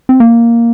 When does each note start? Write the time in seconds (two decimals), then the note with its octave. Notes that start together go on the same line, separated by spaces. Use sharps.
0.09 C4
0.20 A#3